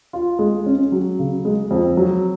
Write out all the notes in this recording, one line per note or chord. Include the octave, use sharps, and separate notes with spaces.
F4
G#3
C#4
F#3
C#3
G#3
F2
F#3